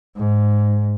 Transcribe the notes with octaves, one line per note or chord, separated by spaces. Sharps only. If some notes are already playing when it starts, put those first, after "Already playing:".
G#2